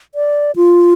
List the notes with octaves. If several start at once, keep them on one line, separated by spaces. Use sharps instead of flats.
D5
F4